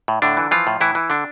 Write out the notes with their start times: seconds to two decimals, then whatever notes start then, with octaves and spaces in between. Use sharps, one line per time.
0.08 A2
0.22 A2 D3 D4
0.37 E3
0.51 E3 F3 F4
0.67 A2
0.80 A2 E3 E4
0.95 E3
1.10 D3 D4